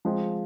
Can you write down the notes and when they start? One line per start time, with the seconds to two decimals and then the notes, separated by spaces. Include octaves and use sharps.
0.05 F3 G#3 C4 F4